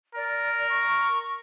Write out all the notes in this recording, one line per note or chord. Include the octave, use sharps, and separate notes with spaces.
A#4 D5
C#6